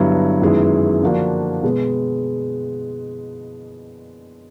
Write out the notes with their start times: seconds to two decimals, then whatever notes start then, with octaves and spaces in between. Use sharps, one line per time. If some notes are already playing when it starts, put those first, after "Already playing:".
Already playing: G2 D3 F#3 B3 E4
0.42 F#2 D#3 G#3 B3 E4
1.02 D3 F3 A#3 D4 F#4
1.63 B2 G#3 B3